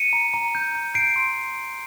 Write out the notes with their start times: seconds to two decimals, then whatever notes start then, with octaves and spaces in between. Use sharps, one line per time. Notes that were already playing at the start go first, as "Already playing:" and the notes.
Already playing: C#7 D#7
0.13 A#5
0.34 A#5
0.55 G6
0.75 G6
0.94 G6 C7 D7
1.16 C6